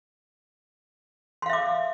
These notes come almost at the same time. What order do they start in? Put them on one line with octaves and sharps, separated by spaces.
C6 F5 E5 D6